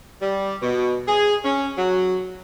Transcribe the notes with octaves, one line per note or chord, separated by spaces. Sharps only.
G3
B2
G#4
C#4
F#3